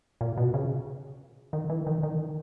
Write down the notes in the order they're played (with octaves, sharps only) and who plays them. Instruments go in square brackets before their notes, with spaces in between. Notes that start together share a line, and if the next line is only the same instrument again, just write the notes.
[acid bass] A#2
B2
C#3
D#3
E3
D#3
D#3